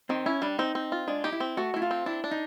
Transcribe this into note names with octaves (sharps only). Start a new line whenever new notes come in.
D#3 C4
C#4 E4
G3 D4
C4 D#4
C4
F4
G#3 D4
D#4 G4
E4
C4
A3 F#4
A3 E4
F4
C4
D4 E4
D4
D#4